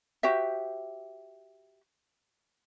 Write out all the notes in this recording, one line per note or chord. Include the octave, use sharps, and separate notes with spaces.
F#4 G4 C5 E5